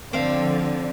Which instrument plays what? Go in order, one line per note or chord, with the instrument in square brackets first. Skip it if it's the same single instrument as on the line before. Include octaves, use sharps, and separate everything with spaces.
[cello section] D3 F3 [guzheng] C4 F5